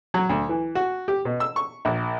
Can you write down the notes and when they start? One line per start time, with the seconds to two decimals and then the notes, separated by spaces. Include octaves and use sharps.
0.14 F#3
0.29 D2
0.49 E3
0.75 F#4
1.08 G4
1.25 B2
1.40 E6
1.56 C#6
1.85 A#1